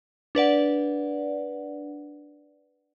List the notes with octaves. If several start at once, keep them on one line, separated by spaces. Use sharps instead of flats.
D4 B4 D5 F#5